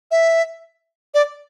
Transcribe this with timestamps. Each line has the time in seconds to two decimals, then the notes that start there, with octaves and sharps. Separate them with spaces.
0.11 E5
1.14 D5